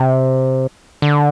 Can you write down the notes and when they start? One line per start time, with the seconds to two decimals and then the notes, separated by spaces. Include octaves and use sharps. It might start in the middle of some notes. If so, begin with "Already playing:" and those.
Already playing: C3
1.02 D3